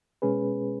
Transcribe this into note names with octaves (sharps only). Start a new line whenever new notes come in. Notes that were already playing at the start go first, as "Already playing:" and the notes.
B2 G#3 C#4 G#4 B4